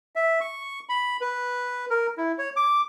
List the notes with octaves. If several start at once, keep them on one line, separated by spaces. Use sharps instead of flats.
E5
C#6
B5
B4
A#4
E4
C#5
D6